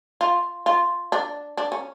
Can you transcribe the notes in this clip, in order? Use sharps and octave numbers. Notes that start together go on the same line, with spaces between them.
F4
F4
D4
D4
C#4